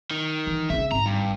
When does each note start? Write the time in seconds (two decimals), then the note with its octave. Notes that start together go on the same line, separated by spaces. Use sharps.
0.11 D#3
0.47 E3
0.70 C#3 C4 E5
0.91 G#1 A#5
1.06 G2